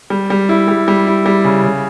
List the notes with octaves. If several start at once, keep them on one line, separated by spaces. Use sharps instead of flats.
G3
G3
E4
G3
G3
E4
G3
C#3
C#3